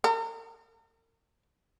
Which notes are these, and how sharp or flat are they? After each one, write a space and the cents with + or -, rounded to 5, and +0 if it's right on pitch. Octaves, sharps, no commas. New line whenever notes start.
A#4 -40